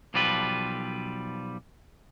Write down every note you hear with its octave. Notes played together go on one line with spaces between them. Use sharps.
B1 F3 G3 F4 A4 B4